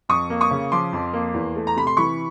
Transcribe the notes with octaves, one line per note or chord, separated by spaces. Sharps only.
F2 C#6 D#6
A#3
C#6 D#6
C#3
F3 C6 D6
F2
A#3
E2
A3
A#5
C3 B5
C6
E3 B5 C#6